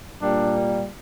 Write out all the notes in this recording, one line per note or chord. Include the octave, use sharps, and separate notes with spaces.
A#2 G3 A#3 D4